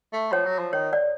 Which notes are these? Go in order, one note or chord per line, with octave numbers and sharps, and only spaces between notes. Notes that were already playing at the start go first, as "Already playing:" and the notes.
A3
F3 C#5
F#3
F3
D#3 C#5
D5